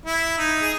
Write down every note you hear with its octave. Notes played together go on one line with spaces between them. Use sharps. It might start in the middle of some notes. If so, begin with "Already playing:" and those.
E4
D#4
G#4